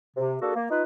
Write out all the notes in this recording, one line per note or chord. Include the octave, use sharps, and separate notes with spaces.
C3
A#3 D4 F#4 G#4 A4
A#3
D#4 F4 B4